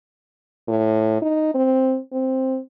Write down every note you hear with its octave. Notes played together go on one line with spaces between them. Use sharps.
A2
D#4
C4
C4